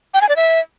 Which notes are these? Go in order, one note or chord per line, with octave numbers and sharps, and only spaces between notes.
G5
G#5
D5
E5